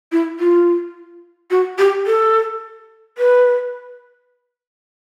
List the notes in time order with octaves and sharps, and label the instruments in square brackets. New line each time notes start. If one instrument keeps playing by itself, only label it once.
[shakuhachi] E4
F4
F#4
G4
A4
B4